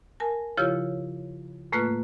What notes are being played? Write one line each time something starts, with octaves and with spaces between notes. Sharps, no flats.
A#4 G#5 A5
C#3 F3 E4 F4 G4 C#5
A2 A3 A#3 F4 B4 F#6